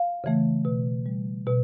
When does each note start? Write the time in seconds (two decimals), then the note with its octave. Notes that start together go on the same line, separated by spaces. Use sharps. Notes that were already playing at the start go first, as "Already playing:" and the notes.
Already playing: F5
0.24 C#3 E3 A3
0.65 B2
1.06 G3
1.47 B2